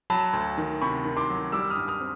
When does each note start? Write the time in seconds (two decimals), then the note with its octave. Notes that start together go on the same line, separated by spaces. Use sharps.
0.10 F#3 A5 B5
0.33 D2
0.58 D#3
0.82 C3 B5 C#6
1.05 D#3
1.17 C6 D6
1.30 F#3
1.52 G3 D6 E6
1.70 D#6 F6
1.76 G2
1.88 D#6 F6
2.00 C4